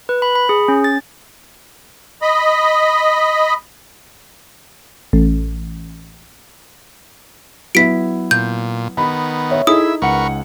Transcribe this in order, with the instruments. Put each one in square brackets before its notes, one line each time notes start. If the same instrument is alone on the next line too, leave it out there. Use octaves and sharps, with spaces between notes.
[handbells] B4
B5
B5
G#4
C#4
A6
[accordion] D#5 B5
[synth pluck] A1
[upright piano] F#3 B3 E4 [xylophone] B6 D7
[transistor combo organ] A#2 [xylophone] G6
[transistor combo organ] D#3 B3 [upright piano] B5
[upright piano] C#5 E5
[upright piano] D#4 [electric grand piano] E4 G#4 A4 [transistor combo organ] E5 [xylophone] D#6
[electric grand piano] C#2 F#5 C#7 [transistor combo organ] A#4 B4 C#6